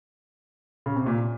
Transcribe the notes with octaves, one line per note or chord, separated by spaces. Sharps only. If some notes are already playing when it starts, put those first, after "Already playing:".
C#3
C3
A#2